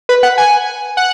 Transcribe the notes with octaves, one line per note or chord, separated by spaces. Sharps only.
B4
F#5
G#5
F#5